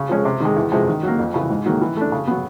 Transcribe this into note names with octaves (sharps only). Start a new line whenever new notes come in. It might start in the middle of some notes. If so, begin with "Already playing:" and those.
Already playing: C#3
F3 G#3 C#4
C3
D#3 G#3
E2
C3 F3 G#3
D#3
F#3 A#3
F2
C#3 E3
G#2
D#3 F#3 A#3
E3
A3 D4
C#3
F#3 B3